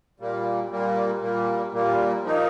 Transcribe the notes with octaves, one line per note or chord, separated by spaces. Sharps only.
A#2 G3 A#3
A#2 G3 A#3
A#2 G3 A#3
A#2 G3 A#3
F3 A#3 D#4